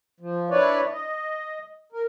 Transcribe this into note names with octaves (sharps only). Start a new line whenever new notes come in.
F3
D4 E4 B4 C#5 D5
D#5
A#4